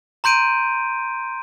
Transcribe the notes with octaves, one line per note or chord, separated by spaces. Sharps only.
A#5 C6 G6 D7 D#7